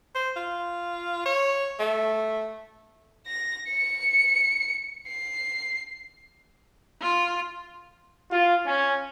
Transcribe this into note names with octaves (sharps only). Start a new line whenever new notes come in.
C5
F4
C#5
A3
A#6
C#7
C7
F4
F4
C#4